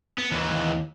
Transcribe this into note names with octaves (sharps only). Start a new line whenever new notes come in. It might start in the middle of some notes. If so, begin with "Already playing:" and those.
B3
D#2 E3